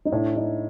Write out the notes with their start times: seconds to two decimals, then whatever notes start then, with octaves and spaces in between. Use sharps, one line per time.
0.05 D#4
0.12 A2 D4
0.36 D#4